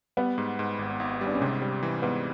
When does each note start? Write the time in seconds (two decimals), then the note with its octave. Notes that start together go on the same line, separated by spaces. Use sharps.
0.17 G3 B3
0.38 G#2
0.59 G#2
0.79 G#1
1.00 G#1
1.21 G3
1.27 D4
1.34 C#4
1.40 G#2 C3 C4
1.62 G3
1.83 E3
2.02 G#2 B3